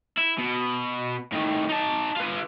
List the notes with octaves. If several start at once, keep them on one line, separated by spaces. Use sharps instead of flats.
E4
B2
A2 D#3
D#4 A5
F4 B4